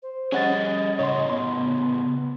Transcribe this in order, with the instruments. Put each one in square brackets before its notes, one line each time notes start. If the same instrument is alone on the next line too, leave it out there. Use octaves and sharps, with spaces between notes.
[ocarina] C5
[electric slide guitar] G3 G4 G#4 [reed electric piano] C#4 F#5 A6 [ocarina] D#5
[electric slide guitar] A2 C#3 [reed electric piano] C#5 C6
[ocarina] B3 [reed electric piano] C6